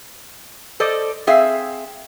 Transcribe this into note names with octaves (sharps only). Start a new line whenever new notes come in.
A4 C5 D5 D#5
C4 G#4 E5 F5